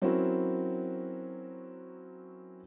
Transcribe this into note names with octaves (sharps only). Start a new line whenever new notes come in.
F#3 C4 C#4 E4 F#4 A#4